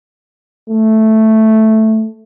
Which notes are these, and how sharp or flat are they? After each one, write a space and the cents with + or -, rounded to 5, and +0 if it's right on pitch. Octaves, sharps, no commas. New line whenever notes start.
A3 +0